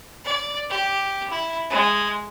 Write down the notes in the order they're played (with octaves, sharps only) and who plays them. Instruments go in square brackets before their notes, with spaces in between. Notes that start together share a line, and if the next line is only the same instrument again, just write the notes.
[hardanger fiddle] D5
G4
E4
G#3